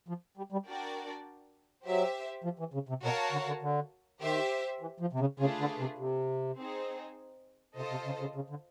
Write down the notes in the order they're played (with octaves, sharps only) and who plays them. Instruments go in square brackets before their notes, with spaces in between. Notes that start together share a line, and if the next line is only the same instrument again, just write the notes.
[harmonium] F3
G3
G3
[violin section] D4 F#4 A#4 D5 G5
[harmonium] F#3 [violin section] G4 C5 E5
[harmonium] F3
E3
C#3
C3
[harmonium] B2 [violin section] F#4 A#4 C#5 F5 A5
[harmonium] D3
D3
D3
[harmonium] D#3 [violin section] G4 C5 E5
[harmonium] E3
F3
C3
C#3
[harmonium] C#3 [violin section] A3 D4 F4 G#4 B4
[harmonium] D3
C3
C3
[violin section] C4 D#4 G#4 C5
[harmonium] C3 [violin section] F4 A4 C5 D#5
[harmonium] C3
C#3
C#3
C#3
D3